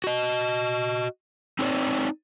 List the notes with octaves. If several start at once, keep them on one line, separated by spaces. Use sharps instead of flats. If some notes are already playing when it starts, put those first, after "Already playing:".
F#4 D#5
C4 D#4 F#4 A4 C#5 D5